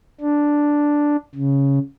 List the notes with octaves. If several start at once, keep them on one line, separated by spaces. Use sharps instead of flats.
D4
C#3